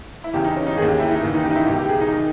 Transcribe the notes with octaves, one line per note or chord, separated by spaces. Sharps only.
E4
E2 C#3 E3 G4
D#4
C#4
D#4
D#2 D#3 G#4
G4
E4
D#4
D#2 C#3 E3
D#4
G4
D#4
E4
C#2 B2 G4
G4
G#4
D#4
D#3